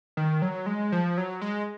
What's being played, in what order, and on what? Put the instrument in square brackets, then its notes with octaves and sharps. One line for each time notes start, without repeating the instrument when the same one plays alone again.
[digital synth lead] D#3
F#3
G#3
F3
F#3
G#3